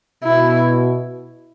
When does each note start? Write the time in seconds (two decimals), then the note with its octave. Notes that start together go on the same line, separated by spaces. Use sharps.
0.23 B2 E4